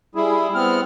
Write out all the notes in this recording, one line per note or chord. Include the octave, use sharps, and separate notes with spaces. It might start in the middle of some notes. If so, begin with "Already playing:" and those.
G3 E4 G#4
B3 C4 F6